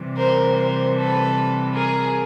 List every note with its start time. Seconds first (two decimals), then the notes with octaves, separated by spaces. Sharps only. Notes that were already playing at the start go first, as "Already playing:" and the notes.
Already playing: C3 E3 G3
0.17 A#4 C5
0.56 A#4 C5
0.96 A4 B4
1.74 G#4 A#4